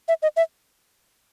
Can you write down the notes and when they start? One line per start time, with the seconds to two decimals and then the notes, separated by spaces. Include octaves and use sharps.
0.08 E5
0.22 D#5
0.37 E5